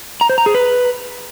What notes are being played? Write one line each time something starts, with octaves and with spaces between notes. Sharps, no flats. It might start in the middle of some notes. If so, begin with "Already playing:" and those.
A#5
C5
A#5
G#4
B4